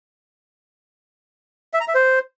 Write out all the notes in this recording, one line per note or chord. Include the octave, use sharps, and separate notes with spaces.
E5
A#5
E5
C5